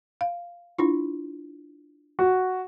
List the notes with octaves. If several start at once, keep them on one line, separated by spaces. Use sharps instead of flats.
F5
D4 E4 F4
F#4